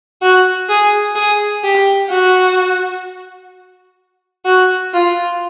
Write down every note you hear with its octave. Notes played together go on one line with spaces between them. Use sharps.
F#4
G#4
G#4
G4
F#4
F#4
F4